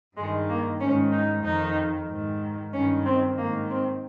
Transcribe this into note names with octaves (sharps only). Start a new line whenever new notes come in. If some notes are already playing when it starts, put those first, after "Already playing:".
G2 D#3 G#3
A#3
G#2 D#3 C#4
D#4
F2 D#3 D#4
G#2 D#3
G2 D#3 C#4
C4
G#2 D#3 A#3
C4